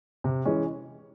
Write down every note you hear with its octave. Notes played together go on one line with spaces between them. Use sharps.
C3
E3 G#3 C#4